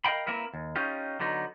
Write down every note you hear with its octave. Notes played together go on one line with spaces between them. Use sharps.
A#4 D#5 F5 G5 B5
A#3 C4 E4 A#4 B4
D#2
C#4 D#4 F4 G4
D3 F#3 B3 D#4